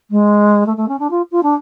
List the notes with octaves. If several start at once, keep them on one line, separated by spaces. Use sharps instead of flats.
G#3
A3
A3
C#4
D4
F4
F4
D4